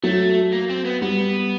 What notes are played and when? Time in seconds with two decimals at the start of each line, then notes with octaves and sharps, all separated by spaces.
0.03 F#3 A3
0.52 A#3
0.69 C4
0.85 B3
1.02 G3 B3